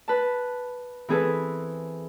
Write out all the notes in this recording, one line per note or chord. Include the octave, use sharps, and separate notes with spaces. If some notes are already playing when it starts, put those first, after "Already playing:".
B4 A5
E3 C4 G#4 A4 B4